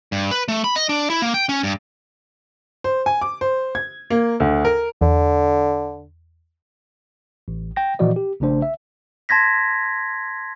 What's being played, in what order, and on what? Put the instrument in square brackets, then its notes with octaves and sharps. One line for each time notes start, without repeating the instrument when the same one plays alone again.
[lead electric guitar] G2
B4
A3
B5
D#5
D4
E4
A#3
G5
C#4
G2
[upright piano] C5
G#5
D6
C5
G#6
A#3
D2
A#4
[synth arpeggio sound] E2 [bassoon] D3
[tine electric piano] A1
G5 A#6
A#2 E3 F3 F#4 D5 D#5
G4
A#1 C#3 A3 D4 C5
E5
[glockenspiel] A5 C6 G#6 A#6 B6